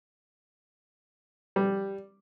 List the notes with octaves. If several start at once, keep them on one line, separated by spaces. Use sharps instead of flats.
G3